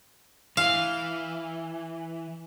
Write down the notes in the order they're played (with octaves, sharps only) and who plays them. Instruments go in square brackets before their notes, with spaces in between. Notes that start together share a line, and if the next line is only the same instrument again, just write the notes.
[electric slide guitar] E3 [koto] F5